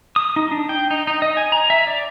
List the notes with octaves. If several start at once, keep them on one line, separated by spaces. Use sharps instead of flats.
D#6
D#4
D4
G5
D#4
D#4
D#5
G#5
A#5
E5
D5